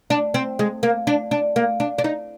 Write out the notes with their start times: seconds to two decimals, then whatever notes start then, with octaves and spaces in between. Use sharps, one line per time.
0.10 D4
0.34 C4
0.59 G#3
0.83 A#3
1.07 D4
1.31 D4
1.56 A#3
1.80 D4
1.98 D4
2.04 D#4